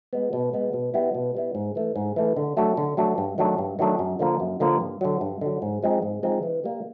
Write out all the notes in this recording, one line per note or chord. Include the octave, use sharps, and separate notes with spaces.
G#3 B3
B2
G#3 B3
B2
G3 B3 E4
B2
G3 B3 E4
G#2
E3 A3
G#2
E3 A3
D3
F#3 A3 D4 F#4
D3
F#3 A3 D4 F#4
G2
D#3 F#3 A3 D4
G2
D#3 F#3 A3 D4
F#2
D3 F3 A#3
F#2
D3 F3 A#3
G2
D3 F#3
G2
D3 F#3
G#2
F3 G#3 C4 D#4
G#2
F3 G#3 C4 D#4
E3
G3 A#3